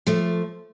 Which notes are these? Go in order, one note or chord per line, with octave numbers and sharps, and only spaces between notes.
F3 A3